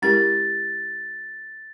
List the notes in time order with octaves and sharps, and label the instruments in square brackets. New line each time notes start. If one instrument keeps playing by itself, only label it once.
[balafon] G#3 C#4 E4 G4 A#4 [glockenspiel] A6